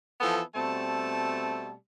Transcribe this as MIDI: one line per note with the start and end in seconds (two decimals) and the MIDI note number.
0.21 0.41 52
0.21 0.41 53
0.21 0.41 59
0.21 0.41 69
0.55 1.74 47
0.55 1.74 55
0.55 1.74 57
0.55 1.74 60
0.55 1.74 81